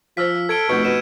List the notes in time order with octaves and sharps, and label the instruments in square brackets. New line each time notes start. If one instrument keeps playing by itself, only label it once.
[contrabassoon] F3 [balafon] C5 F5 [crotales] E6 F6 B6
[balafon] F5
[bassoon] A4 [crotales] G#6 D7 G7
[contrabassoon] F1 [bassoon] B2 [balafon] A3 C#6 [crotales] G6 C#7
[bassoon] B2 [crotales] D#7 E7